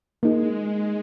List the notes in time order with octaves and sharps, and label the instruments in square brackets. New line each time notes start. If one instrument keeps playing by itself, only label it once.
[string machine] G#3 [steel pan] A#3 D#4 G#4